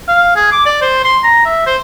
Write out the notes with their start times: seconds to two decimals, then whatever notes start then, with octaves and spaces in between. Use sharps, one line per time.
0.08 F5
0.36 G#4
0.52 D6
0.66 D5
0.82 C5
1.04 C6
1.24 A#5
1.46 E5
1.67 C5